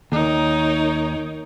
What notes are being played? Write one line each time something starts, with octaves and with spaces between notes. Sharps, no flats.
D#2 D#4 A#4 C#5